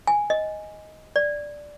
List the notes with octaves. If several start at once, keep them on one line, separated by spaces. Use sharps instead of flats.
G#5
D#5
D5